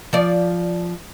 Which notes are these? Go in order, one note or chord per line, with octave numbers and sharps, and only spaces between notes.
F3 D5